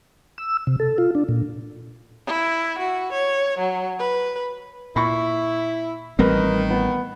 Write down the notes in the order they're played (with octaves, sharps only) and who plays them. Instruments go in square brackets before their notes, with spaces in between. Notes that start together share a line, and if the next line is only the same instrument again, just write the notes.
[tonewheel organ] E6
C3
A4
F4
D4
A#2
[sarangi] E4
F#4
C#5
F#3
B4
[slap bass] A#2 [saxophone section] E4 [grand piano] B5 C#6
[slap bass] A1 G3 C4 [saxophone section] D#3 [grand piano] A#4 B4
[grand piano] B3